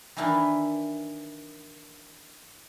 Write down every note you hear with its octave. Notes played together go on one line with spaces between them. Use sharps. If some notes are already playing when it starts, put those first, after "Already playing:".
D#3 E3 D4 E4 A#4 B4